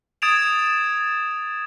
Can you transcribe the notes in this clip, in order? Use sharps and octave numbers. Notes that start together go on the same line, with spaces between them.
D#6 G#6 A6 D7 E7 F7